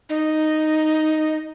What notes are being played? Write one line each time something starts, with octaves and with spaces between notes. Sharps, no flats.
D#4